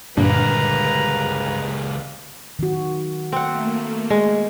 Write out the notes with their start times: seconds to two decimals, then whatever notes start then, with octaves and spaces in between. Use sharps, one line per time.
0.17 C#2 G2 A#2 D3 A#3 B4 A#5
2.59 D#3 F#4
3.32 A3 A#3 C4 F#5
4.10 G#3